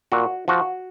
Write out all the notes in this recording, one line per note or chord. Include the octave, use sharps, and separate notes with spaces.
A#2 F#4
F3 F#4